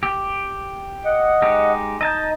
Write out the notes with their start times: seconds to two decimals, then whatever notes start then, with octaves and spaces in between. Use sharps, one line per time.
0.03 G4
1.05 D#5 F#5
1.42 G#3 D#4 G4
2.01 D#4 D#5 A5 G6